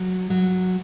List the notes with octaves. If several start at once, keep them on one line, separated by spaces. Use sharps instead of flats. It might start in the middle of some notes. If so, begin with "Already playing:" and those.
Already playing: F#3
F#3